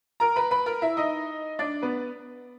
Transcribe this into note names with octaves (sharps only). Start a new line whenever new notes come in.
A#4 A#5
B4 B5
B4 B5
A#4 A#5
E4 E5
D#4 D#5
D4 D5
B3 B4